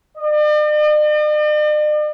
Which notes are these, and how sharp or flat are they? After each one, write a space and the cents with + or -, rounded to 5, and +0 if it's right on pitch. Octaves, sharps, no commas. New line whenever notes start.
D5 +45